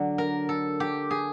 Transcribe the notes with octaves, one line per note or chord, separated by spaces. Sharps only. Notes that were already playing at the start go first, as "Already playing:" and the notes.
Already playing: D3 F#3 D4
A#4
A4
G4
G#4